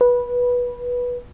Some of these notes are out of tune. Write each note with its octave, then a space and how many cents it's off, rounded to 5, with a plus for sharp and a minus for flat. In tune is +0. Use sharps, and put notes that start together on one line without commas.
B4 -15